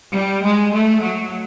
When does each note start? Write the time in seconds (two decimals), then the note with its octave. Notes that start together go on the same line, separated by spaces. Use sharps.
0.13 G3
0.42 G#3
0.72 A3
1.01 F#3